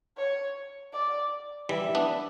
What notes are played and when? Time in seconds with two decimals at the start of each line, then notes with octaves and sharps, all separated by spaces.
0.17 C#5
0.93 D5
1.69 E3 G3 E5
1.95 B3 D4